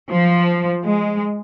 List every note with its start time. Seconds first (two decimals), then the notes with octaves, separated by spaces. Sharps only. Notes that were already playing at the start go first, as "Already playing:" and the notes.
0.11 F3
0.85 G#3